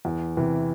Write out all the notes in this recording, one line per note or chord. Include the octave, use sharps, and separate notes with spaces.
E2
C3 E3